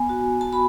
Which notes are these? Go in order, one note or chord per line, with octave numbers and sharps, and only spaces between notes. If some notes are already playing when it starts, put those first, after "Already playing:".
Already playing: B3 G#5
F#4
A5
F#4 B5